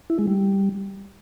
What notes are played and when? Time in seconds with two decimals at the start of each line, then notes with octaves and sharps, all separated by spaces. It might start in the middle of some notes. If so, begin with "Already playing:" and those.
0.10 E4
0.19 G#3
0.27 G3